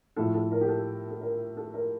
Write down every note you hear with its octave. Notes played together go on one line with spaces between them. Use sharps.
A2 F3 A4
A4
A#4
G4
A4
A4
A#4
A4
A#4